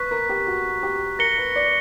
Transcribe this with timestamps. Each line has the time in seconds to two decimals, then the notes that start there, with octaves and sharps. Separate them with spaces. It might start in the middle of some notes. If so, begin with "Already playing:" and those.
Already playing: B4 C#6 F#6 B6
0.11 A#4
0.29 G4
0.47 F#4
0.83 G4
1.19 A#4 A#6 C#7 G7
1.38 B4
1.56 D5